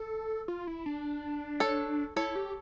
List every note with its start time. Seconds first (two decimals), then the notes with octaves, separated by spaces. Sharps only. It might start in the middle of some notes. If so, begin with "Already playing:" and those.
Already playing: A4
0.48 F4
0.67 E4
0.86 D4
1.60 A4 C#5
2.16 E4 A4 C#5
2.35 G4